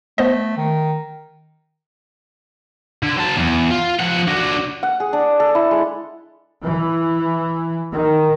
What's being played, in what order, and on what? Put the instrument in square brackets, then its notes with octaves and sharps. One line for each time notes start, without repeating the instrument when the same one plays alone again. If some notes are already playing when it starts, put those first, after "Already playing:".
[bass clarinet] A3 [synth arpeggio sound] B3 C5 D#5
[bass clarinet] D#3
[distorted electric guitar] D3
F#3 A5
E2
F4
F3 F#5
D4 F#4
[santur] F#5
G#4
D4
A4
E4
G#3
[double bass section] E3
D#3